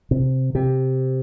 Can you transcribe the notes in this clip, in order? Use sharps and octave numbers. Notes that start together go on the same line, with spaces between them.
C3
C3